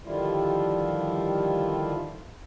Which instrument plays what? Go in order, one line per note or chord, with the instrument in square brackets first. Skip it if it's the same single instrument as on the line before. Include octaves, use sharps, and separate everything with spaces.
[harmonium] D3 D#3 F3 G3 E4 F4